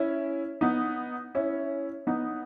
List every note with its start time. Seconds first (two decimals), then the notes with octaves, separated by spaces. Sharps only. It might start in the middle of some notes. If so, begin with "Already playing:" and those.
Already playing: C#4 E4
0.61 B3 D#4
1.35 C#4 E4
2.07 B3 D#4